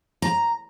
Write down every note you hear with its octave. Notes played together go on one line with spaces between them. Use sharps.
A#5